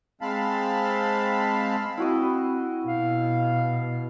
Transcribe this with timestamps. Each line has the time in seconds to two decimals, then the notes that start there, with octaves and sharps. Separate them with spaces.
0.21 G#3 C4 F5 A5 B5
1.97 C4 E4 F#4 D#5
2.85 B2 F5